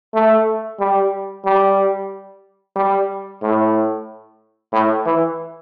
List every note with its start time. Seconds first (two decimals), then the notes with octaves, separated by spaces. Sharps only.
0.14 A3
0.80 G3
1.45 G3
2.76 G3
3.42 A2
4.72 A2
5.06 E3